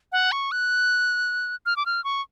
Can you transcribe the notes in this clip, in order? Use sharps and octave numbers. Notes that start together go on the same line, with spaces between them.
F#5
C#6
F#6
F6
D6
F6
C#6